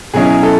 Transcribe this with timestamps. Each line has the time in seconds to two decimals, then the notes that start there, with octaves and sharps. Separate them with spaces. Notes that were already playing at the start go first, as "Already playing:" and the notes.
0.14 B2 F#3 C#4 E4 G#4
0.43 A4